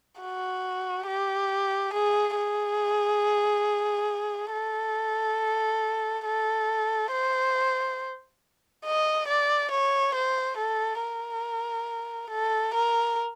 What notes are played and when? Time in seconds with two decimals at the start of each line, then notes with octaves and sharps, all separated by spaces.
0.21 F#4
1.07 G4
1.94 G#4
2.37 G#4
4.53 A4
6.25 A4
7.12 C5
8.85 D#5
9.28 D5
9.71 C#5
10.15 C5
10.58 A4
11.01 A#4
12.30 A4
12.74 A#4